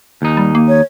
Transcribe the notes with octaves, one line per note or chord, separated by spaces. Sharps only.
D#2 D#4
G3
A#3
C#5